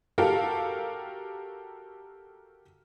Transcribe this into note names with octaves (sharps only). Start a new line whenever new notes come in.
F#4 G4 A4 A#4 F5